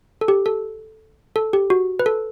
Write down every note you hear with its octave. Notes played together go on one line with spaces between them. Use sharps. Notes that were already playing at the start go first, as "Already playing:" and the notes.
A4
G4
A4
A4
G4
F#4
B4
A4